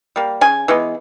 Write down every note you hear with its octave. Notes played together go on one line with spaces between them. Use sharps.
G3 A#3
C#3 G#5
E3 G#3 B3